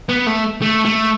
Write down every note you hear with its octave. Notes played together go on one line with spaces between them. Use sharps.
B3
A3
A3
A3